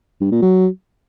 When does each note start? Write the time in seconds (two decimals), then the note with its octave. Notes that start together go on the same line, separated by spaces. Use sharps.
0.21 G2
0.32 A#2
0.42 F#3